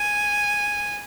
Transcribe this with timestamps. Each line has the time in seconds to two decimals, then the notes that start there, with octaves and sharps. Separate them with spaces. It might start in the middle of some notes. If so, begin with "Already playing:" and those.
Already playing: G#5